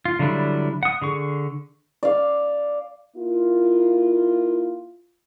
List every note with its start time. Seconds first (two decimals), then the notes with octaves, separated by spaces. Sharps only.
0.05 F4
0.19 D3 F#3 G3 D4 E4
0.83 F#5 D#6
1.02 D3 G#4 C#6
2.03 D5 F5
3.16 A#3 E4 F4